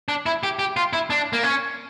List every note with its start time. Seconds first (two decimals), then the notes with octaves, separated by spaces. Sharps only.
0.08 D4
0.26 E4
0.43 G4
0.59 G4
0.77 F4
0.93 E4
1.10 D4
1.33 A#3
1.43 C#4